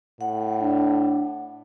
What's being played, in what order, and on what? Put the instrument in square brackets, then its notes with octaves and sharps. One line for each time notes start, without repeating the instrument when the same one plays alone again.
[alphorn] A2 [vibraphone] F#5
[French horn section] D4